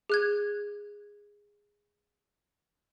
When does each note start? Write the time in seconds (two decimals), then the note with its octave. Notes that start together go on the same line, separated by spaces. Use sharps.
0.10 G#4 F#6 G#6